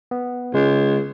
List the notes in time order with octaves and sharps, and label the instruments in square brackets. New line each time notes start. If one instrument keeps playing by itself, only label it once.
[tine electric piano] B3
[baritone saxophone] C#2 [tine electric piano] C#3 G#3